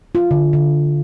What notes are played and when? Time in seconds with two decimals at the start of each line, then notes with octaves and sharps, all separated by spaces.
0.15 F4
0.31 D3
0.53 D3